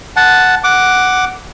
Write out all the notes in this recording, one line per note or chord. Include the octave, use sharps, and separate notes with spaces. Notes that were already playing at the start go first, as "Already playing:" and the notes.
F#5 A5
F#5 D6